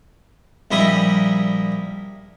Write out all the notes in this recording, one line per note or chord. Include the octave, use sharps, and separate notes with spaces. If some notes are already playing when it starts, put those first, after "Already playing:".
A#1 G3 E4 D#5 A#5